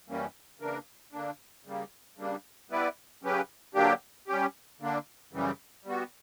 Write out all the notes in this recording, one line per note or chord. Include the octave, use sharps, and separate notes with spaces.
F#2 E3 G3 A#3 C#4
C#3 E3 A#3 D4 A#4
D3 A#3 D4
C#3 G3 A#3
C#3 G3 A#3 D4
G3 B3 E4 B4 D5
C#3 F#3 C#4 G4 B4
D3 F#3 A#3 D4 G4
G3 C#4 G4
D3 A#3 D4
F#2 C#3 E3 G3
G3 B3 F#4